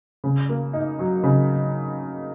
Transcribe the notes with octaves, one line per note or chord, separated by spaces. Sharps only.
C#3
A#3
D#4
F#3
C#3